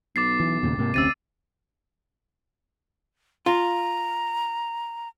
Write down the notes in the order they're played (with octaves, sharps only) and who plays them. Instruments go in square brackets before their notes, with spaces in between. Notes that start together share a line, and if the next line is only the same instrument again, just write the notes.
[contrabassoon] B1 [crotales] D6 A6 C7
[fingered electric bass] E3
D#2 A#2 C#3
G#2 C3 A#3
[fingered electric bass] F1 D2 C#4 [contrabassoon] C3 [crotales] E6 A6 D#7
[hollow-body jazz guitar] F4 [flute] A#5